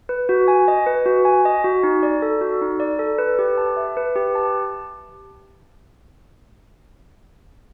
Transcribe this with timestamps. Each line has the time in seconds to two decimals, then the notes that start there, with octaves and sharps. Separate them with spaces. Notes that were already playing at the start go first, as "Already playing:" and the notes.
0.09 B4
0.29 F#4
0.48 G#5
0.68 D#5
0.87 B4
1.06 F#4
1.25 G#5
1.45 D#5
1.64 F#4
1.83 D#4
2.03 D5
2.22 A4
2.41 F#4
2.62 D#4
2.80 D5
2.99 A4
3.18 B4
3.39 G4
3.58 A5
3.77 E5
3.97 B4
4.16 G4
4.35 A5